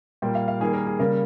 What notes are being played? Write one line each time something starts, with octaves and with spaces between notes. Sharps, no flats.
A#2 G3 A#3 G5
F5
F5
D#3 G3 A#3 G#4
A#4
G#4
C#3 G3 A#3 A#4